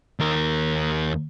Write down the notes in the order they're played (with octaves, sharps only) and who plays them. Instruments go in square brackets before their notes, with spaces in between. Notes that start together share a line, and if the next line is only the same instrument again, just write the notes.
[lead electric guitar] D#2 A#4